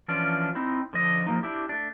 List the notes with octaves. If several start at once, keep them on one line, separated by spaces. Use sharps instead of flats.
E3 F3 C#4 D4 F4 D5
C4 D#4 E4
D3 F3 D#5
F3 A#3 D#4
D4 E4 G4
A3 D4